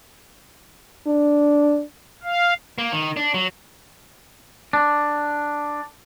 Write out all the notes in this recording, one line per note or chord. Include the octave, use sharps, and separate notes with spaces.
D4
F5
A#3
D#3
D4
F#3
D4